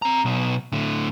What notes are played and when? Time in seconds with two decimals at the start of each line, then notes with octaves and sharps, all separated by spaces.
0.02 C4 A#5
0.25 B1 B2
0.72 A2 D3